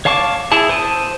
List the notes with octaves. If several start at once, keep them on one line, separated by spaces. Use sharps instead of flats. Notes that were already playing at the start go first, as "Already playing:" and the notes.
C#5 F5 A5 C#6 D6
E4 G#4 A5
C5 A5 D#6